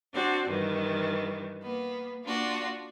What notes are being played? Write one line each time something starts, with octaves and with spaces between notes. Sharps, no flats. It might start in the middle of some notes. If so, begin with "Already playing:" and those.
C4 D4 F#4
G2 D#3 E3
A#3 B3
A#3 D4 F4 F#4